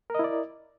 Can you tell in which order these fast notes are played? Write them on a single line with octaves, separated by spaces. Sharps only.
A#4 D#5 E4 D5